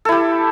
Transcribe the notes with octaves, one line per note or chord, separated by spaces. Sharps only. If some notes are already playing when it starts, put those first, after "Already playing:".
E4 G4 A4